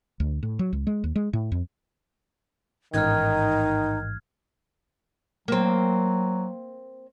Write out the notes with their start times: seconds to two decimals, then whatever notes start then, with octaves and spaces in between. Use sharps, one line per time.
0.20 D2
0.43 A2
0.59 F#3
0.73 C#2
0.87 G#3
1.04 D#2
1.16 G#3
1.33 A2
1.52 F2
2.94 A1 G#2 D#3 D#4 F6 F#6 G#6
5.48 F#3 A#3 C4